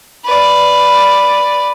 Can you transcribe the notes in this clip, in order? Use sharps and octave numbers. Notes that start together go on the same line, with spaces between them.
B4 D5